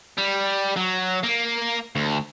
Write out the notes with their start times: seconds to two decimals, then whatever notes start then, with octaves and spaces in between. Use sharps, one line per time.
0.18 G3
0.77 F#3
1.24 A#3
1.96 D2